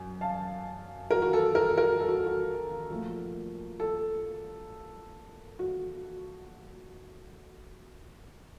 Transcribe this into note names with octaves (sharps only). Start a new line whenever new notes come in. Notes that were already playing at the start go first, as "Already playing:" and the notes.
Already playing: F#2
F5 A5
F#4 A#4
F#4
A4
F#4 A#4
F#4 A#4
A4
F#4
F#4
A#2 F3 A3
A4
F#4